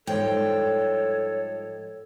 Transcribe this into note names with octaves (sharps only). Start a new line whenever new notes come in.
G#2 F3 G3 A4 C#5 G5